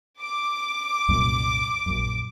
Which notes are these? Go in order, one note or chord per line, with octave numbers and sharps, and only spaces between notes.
D6
C2 F#2 A#2
A#1 F#2